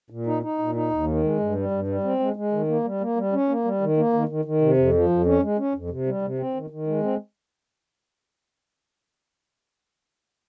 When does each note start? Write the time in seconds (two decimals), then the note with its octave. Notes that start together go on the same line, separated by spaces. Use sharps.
0.10 A#2
0.26 D#4
0.42 D#4
0.58 A#2
0.75 D#4
0.91 D#2
1.07 D#3
1.23 G#3
1.39 G2
1.55 G3
1.71 G2
1.88 G3
2.04 C4
2.20 G#3
2.36 G#3
2.52 D#3
2.68 A#3
2.84 G3
3.00 A#3
3.16 G3
3.32 C#4
3.49 A#3
3.65 G3
3.81 D#3
3.97 A#3
4.13 D#3
4.29 D#3
4.45 D#3
4.61 C3
4.77 F2
4.93 F3
5.10 F2
5.26 C#4
5.42 G#3
5.58 C#4
5.74 F2
5.90 C3
6.06 G3
6.22 C3
6.38 C4
6.54 D#3
6.70 D#3
6.87 G#3
7.03 C4